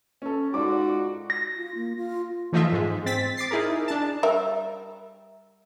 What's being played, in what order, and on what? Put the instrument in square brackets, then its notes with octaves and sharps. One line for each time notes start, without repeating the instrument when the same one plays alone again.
[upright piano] C#4 A4
[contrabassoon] G#2 [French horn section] F4 F#4 [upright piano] D5 D6
[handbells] A#6
[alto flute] F4
A#3
F4
[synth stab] E3 F3 A3 D#4 F4 E5
G#2 G#3
C4 A6 B6
D6 A6 C7
D#4 E4 G#4 A#4
D4 A5
[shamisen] G3 A#4 E5